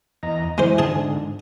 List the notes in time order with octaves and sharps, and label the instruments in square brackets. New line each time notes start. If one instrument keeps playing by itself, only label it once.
[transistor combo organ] E2 D#5 A#5
[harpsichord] G#3 C5 [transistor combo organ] E4
[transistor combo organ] G#2 D3 [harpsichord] G#4 A5